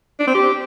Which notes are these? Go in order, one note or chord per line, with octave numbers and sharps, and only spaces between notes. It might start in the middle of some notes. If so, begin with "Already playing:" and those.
D4
C4
G4